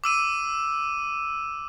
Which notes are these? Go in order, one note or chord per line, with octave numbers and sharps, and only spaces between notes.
D6 E6 D#7